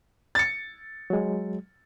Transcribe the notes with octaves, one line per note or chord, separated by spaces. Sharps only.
A6 C#7
F#3 G#3